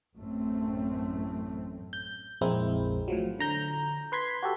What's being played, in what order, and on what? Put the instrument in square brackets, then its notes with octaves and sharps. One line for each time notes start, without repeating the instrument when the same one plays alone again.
[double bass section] A1 F#2 A3 C4
[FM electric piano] G6
A#1 F2 G#3 C4 E4 A#4
A2 F3 F#3
D3 A#5 G6
B4 C6 G#6 B6
F#4 G4 A4